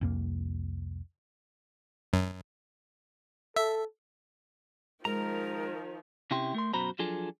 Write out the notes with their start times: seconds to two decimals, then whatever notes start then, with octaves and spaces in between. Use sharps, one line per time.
0.01 C2 F2 A#3
2.13 F#2
3.56 A4 E5
5.05 D#3 F3 G#3 A#4 A#5
6.31 C3 C#4 E4 G4 C6
6.54 A3 A#4 C6
6.73 F#2 B2 F#4 C5 A#5 B5
6.99 F3 F#3 D4 F4 G#4 A4